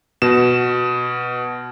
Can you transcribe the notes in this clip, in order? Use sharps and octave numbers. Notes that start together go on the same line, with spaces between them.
B2 E7